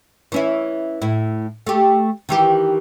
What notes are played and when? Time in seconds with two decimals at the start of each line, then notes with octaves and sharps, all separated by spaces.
0.32 E3 C#4 E4
1.02 A2 E4
1.67 A3 G4
2.29 D#3 E3 G4